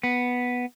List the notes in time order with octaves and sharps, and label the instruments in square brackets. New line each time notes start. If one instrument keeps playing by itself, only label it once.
[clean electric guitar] B3